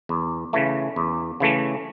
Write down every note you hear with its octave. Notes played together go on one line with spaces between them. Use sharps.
E2
C#3 E3 A3
E2
C#3 E3 A3